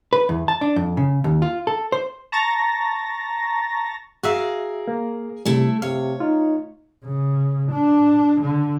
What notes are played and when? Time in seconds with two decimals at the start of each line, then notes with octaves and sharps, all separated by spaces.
0.13 B4
0.29 E2
0.48 A5
0.61 D4
0.76 F2
0.97 C#3
1.24 D#2
1.42 F4
1.67 A4
1.92 C5
2.32 A5 A#5 C#6 A6 A#6
4.23 F#4 G#4 A#4 E5 F5
4.88 A#3
5.45 C3 G3 A3 E4
5.82 C3 C#5 F5
6.20 D#4 F4
7.05 C#3
7.71 D4
8.41 D3